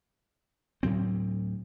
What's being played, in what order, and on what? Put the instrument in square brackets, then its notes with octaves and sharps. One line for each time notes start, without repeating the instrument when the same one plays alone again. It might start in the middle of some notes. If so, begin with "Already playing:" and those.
[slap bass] D2 A2 F#3 C4